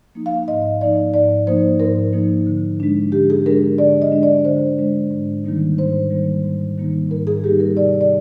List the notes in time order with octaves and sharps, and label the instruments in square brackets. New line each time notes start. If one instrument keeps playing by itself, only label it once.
[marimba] F3 A#3 D#4
F5
G#2 D#5
F3 A#3 D#4 D5
G#2 D5
F3 A#3 D#4 C5
G#2 A#4
F3 A#3 D#4
D3
G#3 D4
D3 G4
G#4
G#3 D4 A#4
D3 D5
D#5
G#3 D4
D5
D3 C5
G#3 D4
G#2
D#3 G3 A#3 D#4
G#2 C5
D#3 G3 A#3 D#4
G#2
D#3 G3 A#3 D#4
G#2 A#4
G#4
D#3 G3 A#3 D#4 G4
A#4
C3 D5
D5